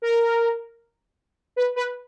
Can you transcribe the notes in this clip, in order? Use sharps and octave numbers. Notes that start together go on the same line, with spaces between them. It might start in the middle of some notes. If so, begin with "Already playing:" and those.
A#4
B4
B4